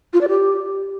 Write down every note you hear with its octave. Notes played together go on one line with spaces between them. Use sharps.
F4
D5
G4